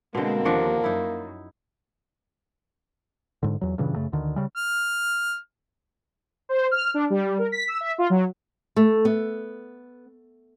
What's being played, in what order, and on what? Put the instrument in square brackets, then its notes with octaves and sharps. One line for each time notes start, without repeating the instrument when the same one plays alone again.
[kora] B2 D3 [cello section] G#3 C4 [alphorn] A#3
[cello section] D#2 [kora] F3 D4 F#4
[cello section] F#2 [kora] D#4 E4
[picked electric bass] G#2 D3
E2 F#3
G2 A#2 C#3 E3
F#2 C#3 A3
D2 D3 D#3
C#3 G3
[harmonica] F6
[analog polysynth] C5
F6
D4
G3
A#4
B6
E6
E5
F4
F#3
[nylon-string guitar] A3
B3